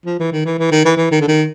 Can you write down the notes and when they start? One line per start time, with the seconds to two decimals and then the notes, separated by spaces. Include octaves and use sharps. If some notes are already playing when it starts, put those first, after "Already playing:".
0.06 F3
0.20 E3
0.32 D#3
0.46 E3
0.59 E3
0.72 D#3
0.85 E3
0.97 E3
1.12 D#3
1.21 D3
1.28 D#3